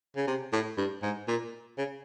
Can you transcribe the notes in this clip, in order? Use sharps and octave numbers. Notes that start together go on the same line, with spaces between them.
C#3
C3
A2
G2
G#2
A#2
C#3